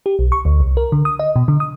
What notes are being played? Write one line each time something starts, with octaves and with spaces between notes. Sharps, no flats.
G4
B1
C#6
D2
C2
A#4
D3
D#6
D#5
B2
D3
D#6